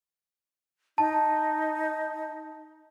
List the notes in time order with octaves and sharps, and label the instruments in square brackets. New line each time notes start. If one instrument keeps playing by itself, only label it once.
[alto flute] D#4 [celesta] A5